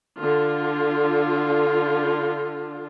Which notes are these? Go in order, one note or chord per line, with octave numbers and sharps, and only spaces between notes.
D3 F4